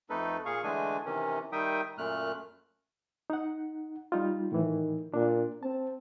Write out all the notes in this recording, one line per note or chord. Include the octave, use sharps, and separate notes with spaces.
F2 A3 D#4 A4 B4
A#2 G#4 F5 C#6
D3 E3 G#3 A3 D4 G#5
C3 D#3 E3 C#4
D#3 G3 D#4 E5 G5 D#6
F#2 A#2 A3 F6 F#6
D#4 F#5
G3 D#4 F4
A2 D#3 E3
A#2 D4
C4 A5